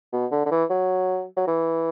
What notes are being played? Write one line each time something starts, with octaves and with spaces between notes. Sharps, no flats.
B2
D3
D3
E3
F#3
F#3
E3